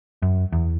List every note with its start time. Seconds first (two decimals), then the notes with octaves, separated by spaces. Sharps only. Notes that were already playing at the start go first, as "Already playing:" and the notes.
0.22 F#2
0.52 E2